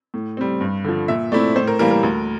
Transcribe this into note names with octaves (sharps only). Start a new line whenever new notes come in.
A2
G3 C4
G2
D3 F3
A#2 E5
A3 C4 E4 D5
A2 C5
A#4
E3 G3 A#3 A#4
A#4
D2